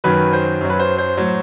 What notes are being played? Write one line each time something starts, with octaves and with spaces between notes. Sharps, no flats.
F#2 D#3 F#3 B4
C5
F#2 F#3
B4
C5
C5
A2 F#3